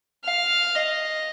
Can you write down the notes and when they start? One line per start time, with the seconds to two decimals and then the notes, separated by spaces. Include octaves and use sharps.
0.24 F5
0.75 D#5